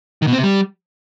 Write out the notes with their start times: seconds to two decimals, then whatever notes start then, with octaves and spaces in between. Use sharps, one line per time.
0.22 D#3
0.27 B2
0.33 C4
0.38 C3
0.43 G3